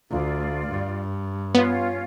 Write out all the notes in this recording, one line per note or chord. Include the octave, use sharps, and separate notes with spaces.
D2 F4 D5
G2
B3 C#4 F4 C#5